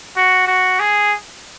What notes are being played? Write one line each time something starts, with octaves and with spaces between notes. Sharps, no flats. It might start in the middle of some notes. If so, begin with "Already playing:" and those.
F#4
F#4
G#4